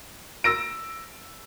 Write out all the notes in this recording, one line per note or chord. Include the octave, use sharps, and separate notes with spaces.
E6 A#6 D7